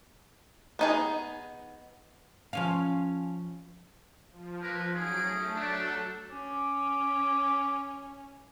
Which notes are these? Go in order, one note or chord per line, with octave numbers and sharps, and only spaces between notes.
B3 D#4 G#4
F3 C#4 F5
F3
A#3 A#4 B4
F#3 C#4 D#4 G#4 D7
A3
F#3 A3 D4 A4
C#4 D6